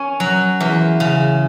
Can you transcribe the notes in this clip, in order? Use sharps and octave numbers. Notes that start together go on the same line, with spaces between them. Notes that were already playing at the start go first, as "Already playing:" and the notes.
Already playing: C#4 G#5
F#3
E2
C#3